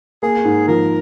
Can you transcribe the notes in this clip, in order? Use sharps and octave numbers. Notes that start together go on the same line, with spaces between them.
A#3 G#4
G#2
F3 A#4